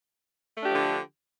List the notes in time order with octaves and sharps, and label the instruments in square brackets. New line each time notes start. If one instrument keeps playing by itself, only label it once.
[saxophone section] A3
D4
G4
F3
D3